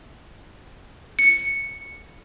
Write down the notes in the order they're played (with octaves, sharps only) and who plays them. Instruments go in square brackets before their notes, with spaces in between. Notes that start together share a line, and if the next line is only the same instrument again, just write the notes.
[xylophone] C#7